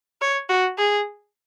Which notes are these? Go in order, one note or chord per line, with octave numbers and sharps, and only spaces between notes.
C#5
F#4
G#4